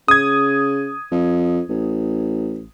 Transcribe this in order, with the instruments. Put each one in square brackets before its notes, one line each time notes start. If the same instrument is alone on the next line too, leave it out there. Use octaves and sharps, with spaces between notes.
[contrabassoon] C#3 [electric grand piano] D#6 G#6
[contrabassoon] F2
A1